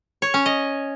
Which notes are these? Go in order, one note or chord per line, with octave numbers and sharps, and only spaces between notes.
C#5
C#4
D#5